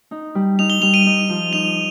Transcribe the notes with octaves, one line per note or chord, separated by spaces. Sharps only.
D#4
G3
D#4 F7
G7
G3 F7
D#7
D#4
F3
D#4 F7